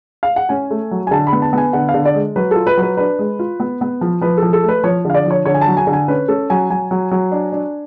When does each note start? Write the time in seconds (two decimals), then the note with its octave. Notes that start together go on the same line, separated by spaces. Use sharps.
0.23 F5
0.36 F#5
0.49 C#4 G#5
0.71 A3
0.91 F#3
1.07 G#5
1.11 D3 A5
1.27 B5
1.33 B3
1.42 A5
1.53 B3 G#5
1.73 D3 F#5
1.89 F5
1.94 D3
2.05 D5
2.15 G#3
2.36 F#3 B4
2.51 F4 A4
2.67 B4
2.77 F#3
2.82 B4
2.97 D4 B4
3.19 G#3
3.39 F4
3.60 B3
3.81 B3
4.01 F3
4.21 F3 B4
4.37 A4
4.42 F3
4.53 A4
4.63 A3
4.68 B4
4.84 F3 C#5
5.05 D3 F5
5.14 D5
5.26 F3 C#5
5.45 D3 C#5
5.54 G#5
5.61 A5
5.67 F#3
5.77 G#5
5.87 D3
5.93 G#5
6.08 C#4 B4
6.28 C#4 A4
6.50 F#3 G#5
6.70 F#3 G#5
6.91 F#3
7.11 F#3
7.32 D4
7.52 D4